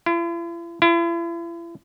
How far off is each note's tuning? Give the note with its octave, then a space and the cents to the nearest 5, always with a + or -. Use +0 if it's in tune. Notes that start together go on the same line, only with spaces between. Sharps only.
E4 +45
E4 +40